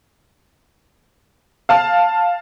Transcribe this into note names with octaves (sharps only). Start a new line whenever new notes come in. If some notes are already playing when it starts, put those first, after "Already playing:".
F5 A5 F6